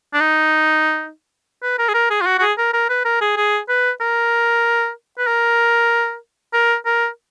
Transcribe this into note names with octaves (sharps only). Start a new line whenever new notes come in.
D4
D#4
B4
A#4
G#4
A#4
G#4
F4
F#4
F#4
G#4
A#4
A#4
B4
A#4
G#4
G#4
B4
A#4
B4
A#4
A#4
A#4